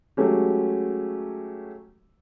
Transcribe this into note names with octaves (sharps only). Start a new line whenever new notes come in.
F#3 G#3 A3 C#4 G4